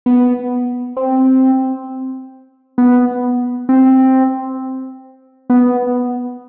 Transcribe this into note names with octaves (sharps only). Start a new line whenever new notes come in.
B3
C4
B3
C4
B3